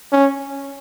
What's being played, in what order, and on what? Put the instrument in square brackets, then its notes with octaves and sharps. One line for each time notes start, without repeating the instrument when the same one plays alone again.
[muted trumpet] C#4